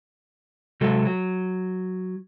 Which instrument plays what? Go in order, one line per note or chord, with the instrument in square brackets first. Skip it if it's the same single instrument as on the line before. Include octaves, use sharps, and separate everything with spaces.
[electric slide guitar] C3 F#3 G#3 A4
F#3